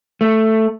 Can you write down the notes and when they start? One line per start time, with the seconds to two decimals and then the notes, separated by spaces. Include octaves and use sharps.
0.21 A3